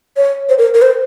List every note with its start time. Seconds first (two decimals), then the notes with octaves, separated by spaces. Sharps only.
0.17 C#5
0.49 C5
0.58 A#4
0.74 A#4
0.82 C5